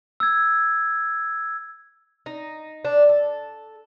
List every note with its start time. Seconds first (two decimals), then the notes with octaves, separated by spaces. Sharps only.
0.20 E6 G#6
2.26 D#4
2.85 D4
3.09 A4